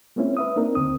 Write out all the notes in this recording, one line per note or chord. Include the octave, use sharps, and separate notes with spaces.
G#3 A#3 C4 C#4 E4
B4 E5 D#6
A#3 C4 D4 D#4 A#4
D2 C4 D#6